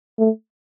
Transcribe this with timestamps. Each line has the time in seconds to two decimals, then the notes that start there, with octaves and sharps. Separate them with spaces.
0.19 A3